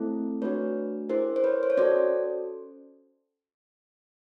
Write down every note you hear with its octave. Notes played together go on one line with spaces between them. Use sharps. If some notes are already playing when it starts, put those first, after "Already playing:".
Already playing: A3 C4 E4 A4
A3 D4 F#4 B4 C#5
C#4 E4 G#4 A#4 C5
C5
B4 C#5
C5
C#5
C#4 F#4 A4 C5 D5